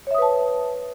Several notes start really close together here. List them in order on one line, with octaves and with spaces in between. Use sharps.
C#5 E5 D#6 B4 A5